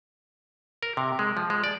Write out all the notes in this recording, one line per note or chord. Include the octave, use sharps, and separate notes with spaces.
A#4
C3
G#3
F3
G#3
D5